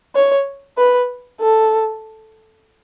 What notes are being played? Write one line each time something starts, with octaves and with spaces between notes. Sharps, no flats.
C#5
B4
A4